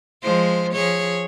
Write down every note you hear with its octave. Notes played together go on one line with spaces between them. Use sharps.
F3 G#3 C5
F3 G#4 C#5